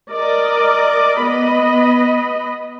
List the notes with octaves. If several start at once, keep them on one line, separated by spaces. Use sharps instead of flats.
A#4 D5 D#5
B3 D#5 B5